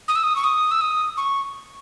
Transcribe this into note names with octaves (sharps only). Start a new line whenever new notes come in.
D#6
E6
D#6
C#6
D#6
E6
D#6
C#6